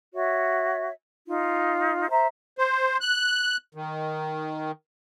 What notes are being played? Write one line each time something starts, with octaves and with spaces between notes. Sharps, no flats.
F#4 C#5 E5
D#4 F4
C5 E5 A#5
C5
F#6
D#3